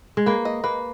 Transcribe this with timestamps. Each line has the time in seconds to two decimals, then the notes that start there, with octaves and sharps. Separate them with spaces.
0.17 G#3
0.26 A#3 B4
0.45 D#5
0.64 A#3 B4